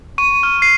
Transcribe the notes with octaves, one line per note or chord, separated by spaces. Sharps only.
C#6 D#7
F6
C7